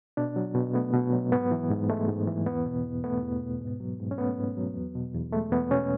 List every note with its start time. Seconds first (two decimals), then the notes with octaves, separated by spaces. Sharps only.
0.17 B2 D4
0.36 F#3
0.55 B2
0.74 A3 B3
0.93 B2
1.13 F#3
1.32 G#2 B3
1.51 E3
1.70 G#2
1.90 G#3 A3
2.08 G#2
2.27 E3
2.46 E2 B3
2.66 B2
2.85 E2
3.04 A3 B3
3.22 E2
3.41 B2
3.61 G#2
3.80 F#3
4.00 G#2
4.11 C#4
4.18 A3 B3
4.38 G#2
4.57 F#3
4.75 E2
4.95 B2
5.14 E2
5.33 G#3 A3
5.52 E2 B3
5.71 B2 C#4